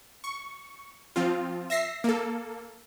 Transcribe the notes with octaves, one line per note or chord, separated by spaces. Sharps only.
C#6
F3 C4 F4
E5 A#6 C7
A#3 A4